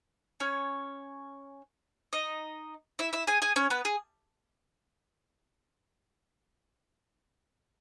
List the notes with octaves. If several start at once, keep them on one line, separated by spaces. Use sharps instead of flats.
C#4 C#5
D#4 D#5
E4 E5
E4 E5
G#4 G#5
G#4 G#5
C#4 C#5
B3 B4
G#4